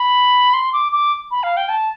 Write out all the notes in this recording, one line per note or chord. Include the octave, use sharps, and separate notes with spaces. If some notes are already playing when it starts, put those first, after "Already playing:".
Already playing: B5
C6
D6
D6
B5
F5
G5
A5